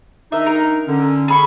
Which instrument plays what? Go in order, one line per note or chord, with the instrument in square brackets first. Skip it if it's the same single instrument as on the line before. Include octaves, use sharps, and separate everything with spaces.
[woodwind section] D#3 D4 D#4 [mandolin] E5
[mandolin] A#4
[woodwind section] D3 C#4
[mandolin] G#4 B5 C#6